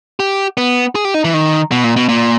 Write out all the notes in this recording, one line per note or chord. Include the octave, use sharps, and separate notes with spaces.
G4
B3
G#4
G4
D#4
E3
D#3
B2
A#2
B2
A#2